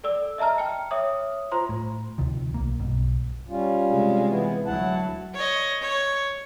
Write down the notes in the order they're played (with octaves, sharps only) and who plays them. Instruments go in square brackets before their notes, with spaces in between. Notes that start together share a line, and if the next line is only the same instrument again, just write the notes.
[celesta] A4 D5 E6
D#5 E5 A5 A#5 F6
G5 F6 C#7
C#5 E5 D6 D#6
F4 C5 A#5 C6
[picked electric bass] A2
D2 C3 D#3 F3
B1 A#3
B1 G2 B2
[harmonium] G3 C#4 F4
[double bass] C3 G#3
[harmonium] E3 B3 E4
[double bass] D2 F#3 [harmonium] E4 F#5 A5
[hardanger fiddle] C#5 D#5
C#5